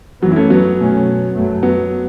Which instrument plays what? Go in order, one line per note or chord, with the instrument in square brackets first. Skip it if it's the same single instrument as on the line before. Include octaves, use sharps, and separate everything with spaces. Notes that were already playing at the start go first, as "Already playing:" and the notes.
[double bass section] F#2 E3 B3 [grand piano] F#3
[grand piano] E4
A3 C#4
F#3 B3
[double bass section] B2 A3 C#4
F#2 F#3 A3
[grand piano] F#3 B3